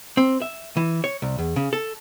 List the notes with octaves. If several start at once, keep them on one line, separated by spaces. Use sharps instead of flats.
C4
E5
E3
C#5
C2
E2
C#3
A4